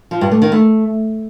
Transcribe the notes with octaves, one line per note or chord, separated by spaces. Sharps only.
F3
G2
A3
D#3
A3